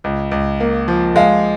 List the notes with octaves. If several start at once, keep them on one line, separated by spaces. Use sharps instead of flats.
C#2
C#2
A#3
F3
G#3 F5